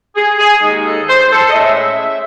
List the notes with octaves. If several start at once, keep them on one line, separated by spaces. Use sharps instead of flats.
G#4
G#4
D#2 D#3 G#3 D#4
A4
C5
C5
A4
D#5
A2 G#3 C#4 E4 E5